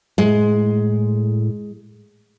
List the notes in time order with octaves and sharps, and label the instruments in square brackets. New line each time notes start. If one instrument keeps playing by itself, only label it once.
[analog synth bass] A2 [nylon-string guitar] G#3